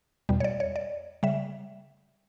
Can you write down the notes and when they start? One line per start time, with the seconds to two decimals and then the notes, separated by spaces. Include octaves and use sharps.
0.29 E2 B2 G3
0.40 C#5
0.44 D5
0.60 C#5
0.76 D5
1.23 C#3 G3 E5